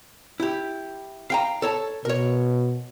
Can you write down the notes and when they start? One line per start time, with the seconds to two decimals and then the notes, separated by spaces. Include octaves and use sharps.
0.40 E4 G4
1.30 F5 G5 A#5
1.62 A4 C#5 A5
2.05 B2 A#4 C#5